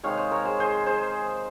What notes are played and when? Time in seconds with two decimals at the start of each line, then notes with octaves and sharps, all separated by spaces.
0.03 C3 D#3 G#3 C#5 F5
0.17 C5 D#5
0.31 A#4 C#5
0.45 G#4 C5
0.60 G#4 C5
0.86 G#4 C5